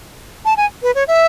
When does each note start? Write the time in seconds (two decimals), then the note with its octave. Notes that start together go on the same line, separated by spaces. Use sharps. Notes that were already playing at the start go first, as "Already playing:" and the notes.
0.45 A5
0.57 G#5
0.83 B4
0.95 C#5
1.08 E5